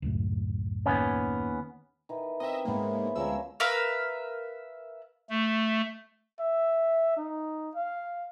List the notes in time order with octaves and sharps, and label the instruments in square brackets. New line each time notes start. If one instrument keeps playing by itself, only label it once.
[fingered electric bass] C#2 F#2 A2
[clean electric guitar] D#2 B3 C#4
[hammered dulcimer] D#3 E3
[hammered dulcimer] C4 A#4 [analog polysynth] D#5 E5
[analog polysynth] G#2 G#3 A#3 [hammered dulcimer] C#3 E3 B3
[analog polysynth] D2 G#3 E6 [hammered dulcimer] F3 C#4 A#4
[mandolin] A#4 B4 E5 F5
[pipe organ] A3
[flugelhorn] E5
D#4
F5